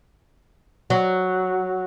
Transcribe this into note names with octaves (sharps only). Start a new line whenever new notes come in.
F#3